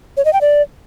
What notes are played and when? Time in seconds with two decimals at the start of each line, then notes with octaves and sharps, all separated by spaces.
0.17 C#5
0.25 D#5
0.33 G5
0.41 D5